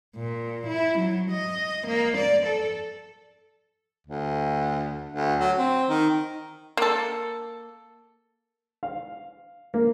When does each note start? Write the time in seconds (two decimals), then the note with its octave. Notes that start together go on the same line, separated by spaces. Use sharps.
0.16 A#2
0.67 E4
0.99 F#3
1.31 D#5
1.87 A#3
2.17 D5
2.47 A4
4.07 D2
5.13 D2
5.40 F#3
5.58 C4
5.89 D#3
6.77 A#3 A4
8.83 F5
9.74 A#3